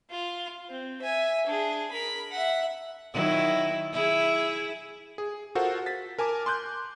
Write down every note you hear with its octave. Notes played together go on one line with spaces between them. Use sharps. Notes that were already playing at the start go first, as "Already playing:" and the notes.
F4
C4
E5 G#5
D4 G#4
A#4 B5
E5 F#5
D#3 F#3 E4
E4 G#4
G#4
F4 F#4 A4 A#4 C5 F#5
A6 B6
A#4 G#5 A5 D6
C6 D6 F#6 G6